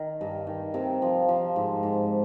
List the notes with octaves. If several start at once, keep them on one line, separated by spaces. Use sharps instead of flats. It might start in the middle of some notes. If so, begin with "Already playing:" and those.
Already playing: D#3 A#4
G2
D#3
C3 A#4
F3
F3
G#2
G#2